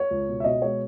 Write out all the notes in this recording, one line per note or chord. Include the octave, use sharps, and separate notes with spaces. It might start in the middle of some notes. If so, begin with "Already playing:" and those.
Already playing: C#5
C#2
B2
E5
B2 D#5
G#3 C#5